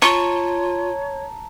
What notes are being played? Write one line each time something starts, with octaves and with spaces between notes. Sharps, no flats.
F4 C#5 A5 A#5 C#6